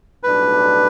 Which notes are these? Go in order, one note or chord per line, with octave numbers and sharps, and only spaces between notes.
B1 A2 G3 D4 B4